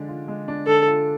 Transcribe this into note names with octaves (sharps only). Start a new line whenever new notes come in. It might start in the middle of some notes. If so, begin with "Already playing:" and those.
Already playing: D3 G#3 D4
F4
G#3
D4
D3 A4
F4